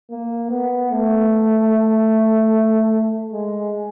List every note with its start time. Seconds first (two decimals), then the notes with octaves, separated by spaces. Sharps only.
0.10 A#3
0.51 B3
0.91 A3
3.33 G#3